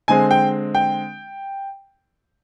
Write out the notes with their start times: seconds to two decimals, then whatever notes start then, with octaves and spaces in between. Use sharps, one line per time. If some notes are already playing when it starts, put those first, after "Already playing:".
0.08 D3 G#3 C4 G#5
0.31 G5
0.75 G5